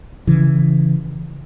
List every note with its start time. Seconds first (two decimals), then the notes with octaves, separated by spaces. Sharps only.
0.27 C#3 E3